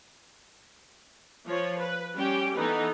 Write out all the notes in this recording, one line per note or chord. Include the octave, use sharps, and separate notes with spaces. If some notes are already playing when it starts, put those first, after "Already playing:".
F3 C#5
B4
G3 C#4 G4 G5
E3 B3 D#4 A4 B4